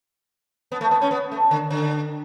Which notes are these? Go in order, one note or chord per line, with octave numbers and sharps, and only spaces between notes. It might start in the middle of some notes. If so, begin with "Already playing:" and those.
B3
A3
B3
C#4
B3
A3
D3
D3